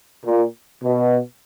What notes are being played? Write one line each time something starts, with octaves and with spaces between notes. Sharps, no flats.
A#2
B2